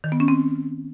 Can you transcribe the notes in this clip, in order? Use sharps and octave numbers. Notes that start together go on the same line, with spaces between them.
D#3
B3
C#4
C4